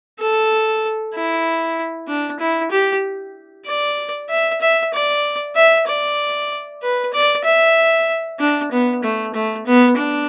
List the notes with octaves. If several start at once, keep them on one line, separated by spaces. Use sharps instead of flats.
A4
E4
D4
E4
G4
D5
E5
E5
D5
E5
D5
B4
D5
E5
D4
B3
A3
A3
B3
D4